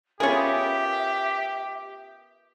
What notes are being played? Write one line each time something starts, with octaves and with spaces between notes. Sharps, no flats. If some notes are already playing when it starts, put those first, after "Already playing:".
B3 C#4 F4 G4 G#4 A#4 E5